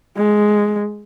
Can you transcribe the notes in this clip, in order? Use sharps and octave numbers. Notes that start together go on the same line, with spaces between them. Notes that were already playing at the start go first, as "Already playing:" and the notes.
G#3